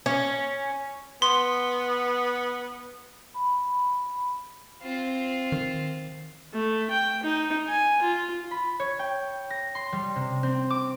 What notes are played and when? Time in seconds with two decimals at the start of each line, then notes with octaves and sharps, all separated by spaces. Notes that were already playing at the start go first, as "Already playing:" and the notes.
0.06 C#4
1.22 B3 C6
3.34 B5
4.82 C4 F4
5.52 D#3
6.53 A3
6.90 G5
7.24 D#4
7.68 G#5
8.02 F4
8.51 B5
8.80 C#5
8.99 G5
9.50 A#6
9.75 C6
9.93 G3
10.16 C3
10.43 C4
10.70 D6